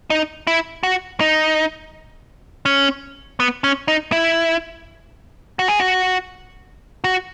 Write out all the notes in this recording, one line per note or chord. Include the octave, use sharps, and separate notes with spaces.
D#4
E4
F#4
D#4
C#4
B3
C#4
D#4
E4
F#4
G#4
F#4
F#4